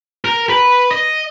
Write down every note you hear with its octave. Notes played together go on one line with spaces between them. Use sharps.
A#4
B4
D#5